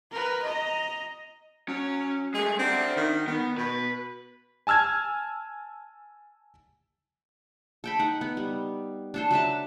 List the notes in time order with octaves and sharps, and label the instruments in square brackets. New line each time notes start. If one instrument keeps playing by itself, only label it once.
[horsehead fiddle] A#4 B4
D#5 A#5
[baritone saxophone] F#3 [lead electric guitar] C#4
[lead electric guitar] G#3 A3 [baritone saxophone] G#4
[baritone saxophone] C4 [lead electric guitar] D4 F#4
[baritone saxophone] D#3
[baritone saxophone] D#3 [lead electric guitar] B3
[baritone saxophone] B2 [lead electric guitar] B4
[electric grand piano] G#5 A5 E6 F6 G#6
[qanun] A4 G5 B5
D#4 F#5
B3
G3
D4 A4 C5
F#3 B4 E5 A5